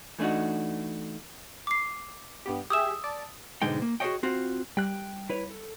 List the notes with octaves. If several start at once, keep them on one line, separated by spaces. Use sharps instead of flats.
E3 A3 D4 D#4 F#4
D6 C7
G2 B3 G4
G4 G#4 E5 D#6 E6 E7
D5 A5
B1 G#2 D3 G#3 D#4 G5
A#3
F#4 G#4 A#4 C#5 D#5 G5
C4 F4 F#4
G3 G5 F#6
E4 B4 C#5
A4